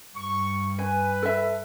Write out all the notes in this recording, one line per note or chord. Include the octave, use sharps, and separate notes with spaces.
G2 C#6
B4 G#5
A4 E5